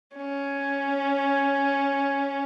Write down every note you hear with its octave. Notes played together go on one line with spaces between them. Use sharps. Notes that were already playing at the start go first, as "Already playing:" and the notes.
C#4